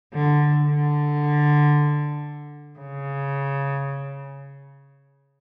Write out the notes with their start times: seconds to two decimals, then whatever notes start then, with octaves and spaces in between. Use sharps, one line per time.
0.13 D3
0.66 D3
2.79 C#3